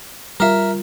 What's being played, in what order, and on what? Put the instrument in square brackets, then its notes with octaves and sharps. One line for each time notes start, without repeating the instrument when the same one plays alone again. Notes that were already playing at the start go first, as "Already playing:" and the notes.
[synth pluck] G3 F4 [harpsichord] A#4 E5